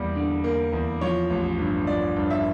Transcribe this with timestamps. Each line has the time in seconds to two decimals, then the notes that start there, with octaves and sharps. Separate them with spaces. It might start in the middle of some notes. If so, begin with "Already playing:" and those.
Already playing: E2 G3 A#3
0.15 D3
0.44 A#3
0.73 E2
1.01 F3 C#5
1.30 A1
1.58 G2
1.87 F3 D5
2.16 G2
2.30 E5